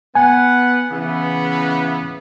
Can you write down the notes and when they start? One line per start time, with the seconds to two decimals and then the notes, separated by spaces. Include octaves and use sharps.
0.15 B3 F#5 G#5
0.92 C#3 E3 B3